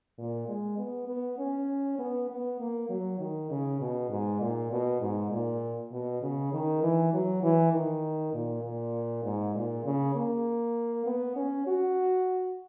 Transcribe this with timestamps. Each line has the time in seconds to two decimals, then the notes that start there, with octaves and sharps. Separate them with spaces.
0.18 A#2
0.48 G#3
0.78 B3
1.08 B3
1.38 C#4
1.99 B3
2.29 B3
2.60 A#3
2.89 F#3
3.19 D#3
3.50 C#3
3.80 B2
4.10 G#2
4.41 A#2
4.72 B2
5.01 G#2
5.31 A#2
5.92 B2
6.22 C#3
6.53 D#3
6.83 E3
7.13 F#3
7.42 E3
7.73 D#3
8.33 A#2
8.63 A#2
9.24 G#2
9.55 A#2
9.85 C#3
10.15 A#3
11.06 B3
11.36 C#4
11.67 F#4